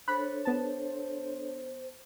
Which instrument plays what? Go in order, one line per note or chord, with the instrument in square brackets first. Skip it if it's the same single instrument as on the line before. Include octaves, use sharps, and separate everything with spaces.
[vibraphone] D4 A4 C#5 [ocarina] C5 [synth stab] B5 F#6
[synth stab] B3 A5